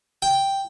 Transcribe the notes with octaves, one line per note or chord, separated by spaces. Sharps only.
G5